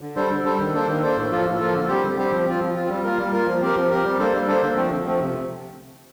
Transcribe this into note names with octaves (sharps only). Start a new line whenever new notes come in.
D3
G3 D4 A4 C5
D3
G3 D4 A4 C5
D#3
A#3 D4 A4 C5
D#3
A#3 D4 A4 C5
A2
F3 A#3 F4 A4
A2
F3 A#3 F4 A4
D3
G3 C4 G4 C5
D3
G3 C4 G4 C5
F3
C4 F4
F3
C4 F4
G3
A#3 F4 A#4
G3
A#3 F4 A#4
F3
C4 G4 A#4
F3
C4 G4 A#4
G3
A#3 D4 A4 C5
G3
A#3 D4 A4 C5
D3
F3 A3 C4
D3
F3 A3 C4
C3